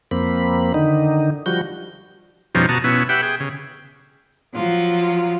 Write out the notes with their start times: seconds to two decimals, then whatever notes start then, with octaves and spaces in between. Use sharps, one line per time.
0.11 F2 A#3 C4 B5
0.74 D3 D#3 D#4
1.46 F3 G3 F#4 G6
2.55 F2 B2 F3 G3 C#4 D#4
2.69 B2 F#4 A5 A#5 D#6
2.84 B2 B3 C#4 E4
3.09 G4 B4 E5 F#5 G5
3.22 G#4 G5
3.40 C#3
4.54 F3 F#3 F4